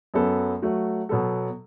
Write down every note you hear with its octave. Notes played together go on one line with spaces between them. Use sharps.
F#2 F#3 B3 A4
F#3 A3 F#4
B2 F#3 B3 A4